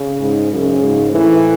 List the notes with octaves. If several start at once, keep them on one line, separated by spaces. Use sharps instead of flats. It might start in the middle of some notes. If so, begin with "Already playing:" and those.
Already playing: C#3
G#2
F#2 C#3
G#2
A2 E3